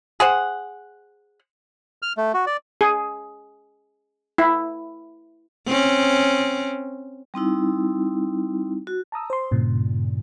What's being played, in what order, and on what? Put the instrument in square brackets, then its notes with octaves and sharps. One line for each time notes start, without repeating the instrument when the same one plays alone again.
[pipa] G#4 C5 F#5
[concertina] F6
A3
F#4
D5
[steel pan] G#4
E4
[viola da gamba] C4 C#4
[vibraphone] G3 C4 D#4 E4
F#4
[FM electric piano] A5 A#5 D#6 E6
C5 C6
G2 A#2 C#3